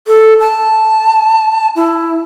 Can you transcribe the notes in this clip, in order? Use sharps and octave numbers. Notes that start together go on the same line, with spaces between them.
A4
A5
E4